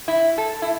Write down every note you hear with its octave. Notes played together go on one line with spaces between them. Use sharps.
E4
A4
E4